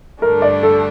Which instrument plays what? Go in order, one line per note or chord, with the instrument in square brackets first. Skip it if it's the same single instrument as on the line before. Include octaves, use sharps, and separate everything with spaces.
[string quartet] G2 D3 A3 D4 [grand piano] A#4
[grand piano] D5
A4